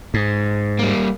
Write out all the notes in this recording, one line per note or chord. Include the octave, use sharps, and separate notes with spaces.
G#2
G3 A#3